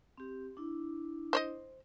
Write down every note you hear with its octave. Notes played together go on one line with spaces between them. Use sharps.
C4 G4
D4 E4
C5 C#5 D#5